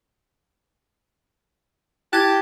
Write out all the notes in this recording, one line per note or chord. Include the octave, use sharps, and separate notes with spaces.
E4 G4 A5 F#6 G#6